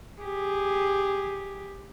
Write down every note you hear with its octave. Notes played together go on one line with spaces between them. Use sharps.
G4 G#4